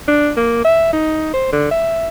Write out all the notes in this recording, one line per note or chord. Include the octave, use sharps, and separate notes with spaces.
D4
A#3
E5
D#4
C5
D3
E5